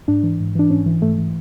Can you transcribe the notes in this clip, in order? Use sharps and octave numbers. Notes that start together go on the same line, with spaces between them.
G#2 D4
E3
G#2
E3 D4
G#2 C#4
E3
G#2 A3
E3